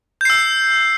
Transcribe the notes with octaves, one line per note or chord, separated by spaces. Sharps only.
E6 G6 C7